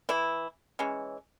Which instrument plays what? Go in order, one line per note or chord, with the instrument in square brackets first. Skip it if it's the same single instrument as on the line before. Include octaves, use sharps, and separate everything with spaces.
[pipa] E3 E4
E3 G#3 C#4